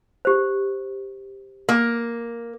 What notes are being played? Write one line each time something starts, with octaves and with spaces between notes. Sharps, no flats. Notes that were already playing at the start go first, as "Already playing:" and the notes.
G4 C5
A#3